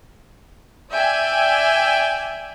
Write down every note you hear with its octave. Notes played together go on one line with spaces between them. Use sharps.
D5 E5 G5 G#5